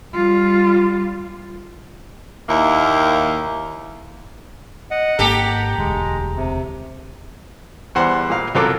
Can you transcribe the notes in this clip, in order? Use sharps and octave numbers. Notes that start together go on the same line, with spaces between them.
G3 F4
D#2 A#3 E4
D#5 F#5
G#1 G#2 A#3 G4 A4 A#5
E1 D2 G#3
C3
E2 G3 C5 F#5 C6
A#2 F5
C2 F#3 F4 A4 A#4 D6